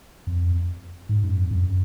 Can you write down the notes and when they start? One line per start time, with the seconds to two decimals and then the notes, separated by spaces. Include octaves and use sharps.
0.27 F2
1.09 G#2
1.23 F#2
1.37 F2
1.51 F#2